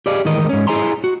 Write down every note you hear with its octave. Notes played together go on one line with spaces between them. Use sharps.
G4 G#4 D5 D#5 F5
A2 D#3 E3 G#3 A#4 D#5
G#2 C#4
E4 G#4 D#5 G#5 A#5 C6
F#4